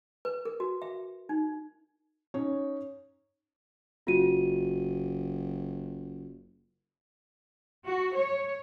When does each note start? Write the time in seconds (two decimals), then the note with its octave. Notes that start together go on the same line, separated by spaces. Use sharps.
0.25 B4
0.45 A#4
0.60 F#4
0.82 E5
1.29 D#4
2.34 C#4 D#4 C#5
4.07 F#1 F4 F#4 D#7
7.86 F#4
8.15 C#5